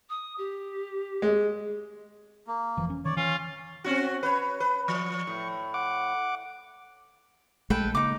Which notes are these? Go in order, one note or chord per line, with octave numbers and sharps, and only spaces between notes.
D#6
G4
G#3
A#3
F1 E3 F3
C#4
D#3 C#5 D5
E3 C#4 F4
C4 C#4 F#4
B4 C#5
B4
F3 C#6
A2
F#5 D6
A#1 G#3 A3 A4 B4 G5
C#3 A#3 D#4 D6